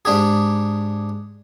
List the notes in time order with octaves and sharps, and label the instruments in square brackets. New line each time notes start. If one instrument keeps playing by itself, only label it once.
[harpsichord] G#2 D4 G4 G#4